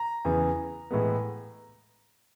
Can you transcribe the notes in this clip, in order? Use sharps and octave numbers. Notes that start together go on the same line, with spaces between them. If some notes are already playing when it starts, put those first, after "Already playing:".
Already playing: A#5
E2 C#3 E3
A2 E3 G#3 B3